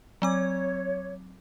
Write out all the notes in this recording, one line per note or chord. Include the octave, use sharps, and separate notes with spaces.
F#3 C4 C#5 D6